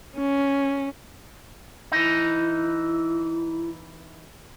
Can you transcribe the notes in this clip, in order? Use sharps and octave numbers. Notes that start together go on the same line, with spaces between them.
C#4
E3 D#4 E4